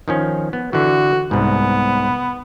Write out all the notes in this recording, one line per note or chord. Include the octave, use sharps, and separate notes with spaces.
D#3 F3 C#4
B3
D3 E3 F#4
C2 G#2 B3